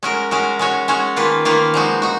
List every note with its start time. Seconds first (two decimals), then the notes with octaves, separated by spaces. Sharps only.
0.03 G#3 C#4 F#4 A#4
0.31 G#3 C#4 F#4 A#4
0.59 G#3 C#4 F#4 C#5
0.88 G#3 C#4 F#4 C#5
1.16 D#3 A#3 F4 B4
1.45 D#3 A#3 F4 B4
1.74 F3 G#3 D#4 F#4
2.02 D#4 F#4